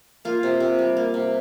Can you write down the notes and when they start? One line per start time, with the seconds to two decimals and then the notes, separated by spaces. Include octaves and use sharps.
0.25 A#3 F4
0.43 C3
0.60 C3
0.79 G3
0.97 A#3
1.14 C3